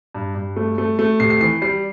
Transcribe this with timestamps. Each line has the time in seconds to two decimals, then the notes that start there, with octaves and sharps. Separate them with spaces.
0.15 G2
0.35 G2
0.56 A3
0.78 A3
0.99 A3
1.20 C3 C7
1.30 C7
1.41 E3 C7
1.62 G3 C7